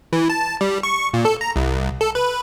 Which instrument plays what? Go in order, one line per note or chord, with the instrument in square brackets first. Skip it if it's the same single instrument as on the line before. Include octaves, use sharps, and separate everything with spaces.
[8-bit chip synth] E3
A5
G3
C#6
A#2
A4
A#5
C2
A4
B4